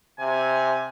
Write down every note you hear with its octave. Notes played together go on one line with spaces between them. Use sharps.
C3 G#5